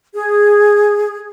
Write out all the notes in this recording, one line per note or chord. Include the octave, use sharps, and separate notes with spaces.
G#4